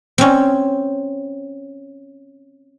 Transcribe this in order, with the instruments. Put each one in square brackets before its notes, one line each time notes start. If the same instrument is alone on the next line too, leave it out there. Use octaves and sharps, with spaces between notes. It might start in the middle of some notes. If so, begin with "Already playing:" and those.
[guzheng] C4 C#4